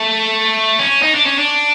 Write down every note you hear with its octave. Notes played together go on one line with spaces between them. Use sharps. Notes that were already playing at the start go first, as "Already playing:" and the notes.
Already playing: A3
C#4
D#4
D4
C#4
D4